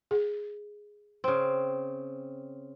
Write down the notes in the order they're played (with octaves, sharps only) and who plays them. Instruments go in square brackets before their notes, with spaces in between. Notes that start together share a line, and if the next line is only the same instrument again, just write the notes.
[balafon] G#4
[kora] C#3 C4